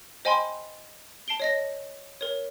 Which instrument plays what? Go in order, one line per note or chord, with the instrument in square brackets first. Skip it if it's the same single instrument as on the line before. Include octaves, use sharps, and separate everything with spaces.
[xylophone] C5 D#5 G5 G#5 B5 C6
A5 C7 D7 G7
C#5 D#5 A#6
A#4 C#5